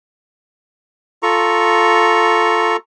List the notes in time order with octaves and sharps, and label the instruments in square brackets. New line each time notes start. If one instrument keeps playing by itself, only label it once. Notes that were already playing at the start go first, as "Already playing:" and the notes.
[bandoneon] F4 A4 A#5 C#6